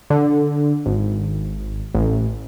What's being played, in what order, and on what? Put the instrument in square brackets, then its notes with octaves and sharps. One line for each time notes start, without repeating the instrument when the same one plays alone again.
[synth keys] D3
G#1
A1